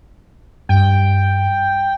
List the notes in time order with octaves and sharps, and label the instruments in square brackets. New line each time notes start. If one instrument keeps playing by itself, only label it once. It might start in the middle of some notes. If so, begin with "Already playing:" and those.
[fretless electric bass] G2 [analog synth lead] G5